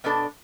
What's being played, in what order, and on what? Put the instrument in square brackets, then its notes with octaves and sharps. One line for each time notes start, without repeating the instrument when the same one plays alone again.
[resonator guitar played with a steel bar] B2 B3 D4 A4 D5